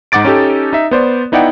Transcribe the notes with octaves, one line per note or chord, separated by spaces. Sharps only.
G#2 D#4 F#5 D6 A6 D7
C#4 D#4 G4 A4
D#4 E5
B3 C5 D5
B3 D#4 E4 D5 F#5 G5